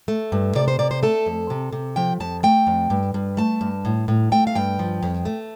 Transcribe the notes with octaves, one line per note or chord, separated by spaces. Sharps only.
A3
G2
C3 D5
C5
C3 D5
C5
A3 A4
F2
C3
C3
F3 G5
F2 A5
A3 G5
F2
G2
G2
A3 A5
G2
A2
A2
A3 G5
F5
G2 G5
F3
F2
A3